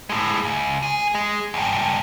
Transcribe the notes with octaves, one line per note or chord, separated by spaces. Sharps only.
A2 G#3
C#2
G#4
G#3
C#2 G2